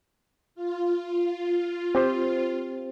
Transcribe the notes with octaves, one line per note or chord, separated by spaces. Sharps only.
F4
C4 G4 C5